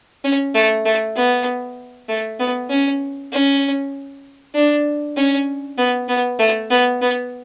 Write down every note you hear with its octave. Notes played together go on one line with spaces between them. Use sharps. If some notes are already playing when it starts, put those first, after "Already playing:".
C#4
A3
A3
B3
A3
B3
C#4
C#4
D4
C#4
B3
B3
A3
B3
B3